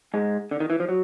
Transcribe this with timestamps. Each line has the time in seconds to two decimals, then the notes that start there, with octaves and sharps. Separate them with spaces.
0.14 G#2 G#3
0.51 D3
0.60 D#3
0.70 E3
0.80 F3
0.89 F#3